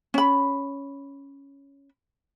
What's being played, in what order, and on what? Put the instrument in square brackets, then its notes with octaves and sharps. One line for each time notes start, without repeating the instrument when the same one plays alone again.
[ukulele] C#4 B5